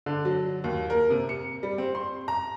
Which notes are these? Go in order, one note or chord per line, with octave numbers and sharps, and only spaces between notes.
D3
F#3
D#2
A#4
C3
C#7
G3
C4
C6
A#5